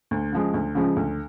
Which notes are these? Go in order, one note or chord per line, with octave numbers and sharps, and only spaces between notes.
D2
C#3 F3 G#3
D2
C#3 F3 G#3
D2